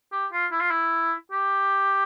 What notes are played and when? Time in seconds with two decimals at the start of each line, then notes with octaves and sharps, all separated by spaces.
0.12 G4
0.32 F4
0.52 E4
0.61 F4
0.71 E4
1.32 G4